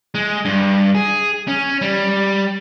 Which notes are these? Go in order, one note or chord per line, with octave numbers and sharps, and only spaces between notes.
G#3
G2
G#4
C#4
G3